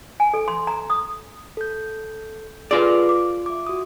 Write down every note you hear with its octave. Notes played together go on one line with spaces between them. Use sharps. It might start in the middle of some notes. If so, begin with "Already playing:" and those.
G#5
A4
C6
A#5
D#6
A4 G6
F4 G#4 A4 B4 D5
D6
E5 D6
F#4 D#6